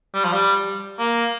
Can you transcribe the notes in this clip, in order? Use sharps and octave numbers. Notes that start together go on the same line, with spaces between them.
G3
F3
G3
A#3